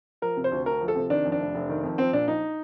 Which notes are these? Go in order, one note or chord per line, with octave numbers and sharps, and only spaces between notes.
F3 A#4
C3
C5
D2
D2 A#4
F3
A4
C3
D#3 D4
F2
D4
F1
F1
D#3
F2
F3 C4
A#2 D4
A#1 D#4